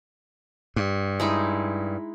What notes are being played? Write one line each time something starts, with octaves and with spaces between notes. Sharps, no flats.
G2
G#3 D#4 E4